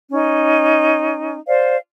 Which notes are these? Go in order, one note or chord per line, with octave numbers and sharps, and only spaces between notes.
C#4 D#4
C5 D5 F5